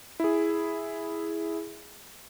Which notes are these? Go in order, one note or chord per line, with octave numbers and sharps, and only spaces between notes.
E4 G#4